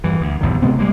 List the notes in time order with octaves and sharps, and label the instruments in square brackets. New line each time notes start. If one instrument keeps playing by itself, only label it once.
[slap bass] G2 E3
D2
A#1 E2 G2 D#3
C3 G#3 B3 C4
G3 G#3 A#3